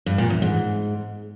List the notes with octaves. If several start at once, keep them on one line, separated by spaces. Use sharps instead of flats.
G2
A#2
E2
G#2